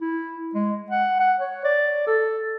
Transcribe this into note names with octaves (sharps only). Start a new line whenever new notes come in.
E4
G#3
F#5
F#5
C#5
D5
A4